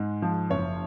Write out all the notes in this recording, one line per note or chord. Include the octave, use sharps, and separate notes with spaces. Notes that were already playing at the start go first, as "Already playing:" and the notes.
Already playing: G#2 G#3
F3
F#1 C#5